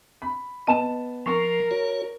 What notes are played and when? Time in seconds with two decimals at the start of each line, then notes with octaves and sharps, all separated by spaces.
0.22 B5
0.67 B3 D#5 A5 E7
1.26 F3 A#4 C6 C#6
1.71 F#4 C#5